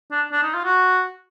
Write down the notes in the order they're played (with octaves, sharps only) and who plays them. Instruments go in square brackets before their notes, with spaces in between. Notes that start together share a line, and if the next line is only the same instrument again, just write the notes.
[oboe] D4
D4
D#4
F4
F#4